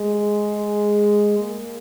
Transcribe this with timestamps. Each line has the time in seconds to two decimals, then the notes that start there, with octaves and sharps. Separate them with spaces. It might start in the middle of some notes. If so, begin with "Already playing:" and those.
Already playing: G#3
1.39 A#3